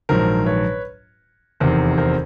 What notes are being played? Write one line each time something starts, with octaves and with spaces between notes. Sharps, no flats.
A#1 G#2 D#3 F#3 A#4 C5
B4 C#5
F1 E2 C3 D#3 A#4 C5
A#4 C5